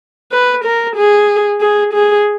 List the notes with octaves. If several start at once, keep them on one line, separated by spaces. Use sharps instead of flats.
B4
A#4
G#4
G#4
G#4